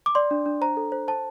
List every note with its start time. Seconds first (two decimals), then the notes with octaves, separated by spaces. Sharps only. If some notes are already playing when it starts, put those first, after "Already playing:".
0.06 D6
0.15 D5 C6
0.31 D4
0.46 D4
0.61 C5 A#5
0.77 A4
0.92 C5
1.08 C5 A5